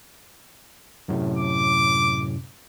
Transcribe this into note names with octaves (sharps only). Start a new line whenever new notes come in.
F#2 A2 C3
D6